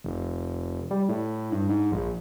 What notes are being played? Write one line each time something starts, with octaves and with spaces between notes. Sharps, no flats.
F1
G3
A2
G2
G#2
A#1